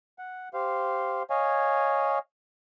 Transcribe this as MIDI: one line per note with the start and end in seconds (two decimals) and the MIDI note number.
0.19 0.49 78
0.54 1.23 67
0.54 1.23 72
0.54 1.23 77
1.30 2.19 73
1.30 2.19 75
1.30 2.19 77
1.30 2.19 80